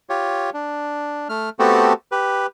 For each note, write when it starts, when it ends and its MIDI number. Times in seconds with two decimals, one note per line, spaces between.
0.10 0.50 65
0.10 0.50 67
0.10 0.50 73
0.54 1.28 62
1.29 1.49 57
1.29 1.49 89
1.59 1.93 57
1.59 1.93 59
1.59 1.93 60
1.59 1.93 66
1.59 1.93 67
1.59 1.93 69
2.12 2.46 67
2.12 2.46 71